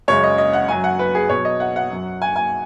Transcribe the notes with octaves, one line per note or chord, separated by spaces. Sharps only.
F#2 C#3 G#3 C#5
D#5
D#5
F#5
F#2 F#3 G#5
F#5
B4
G#4
B2 F#3 C#5
D#5
F#5
F#5
F#2 F#3
G#5
G#5